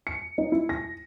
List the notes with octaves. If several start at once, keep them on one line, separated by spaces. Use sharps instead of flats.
C#7
D#4
E4
A#6